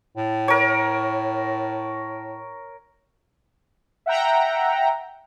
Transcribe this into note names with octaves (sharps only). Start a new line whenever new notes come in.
A2
A#4 C#5
E5 F#5 G5 A#5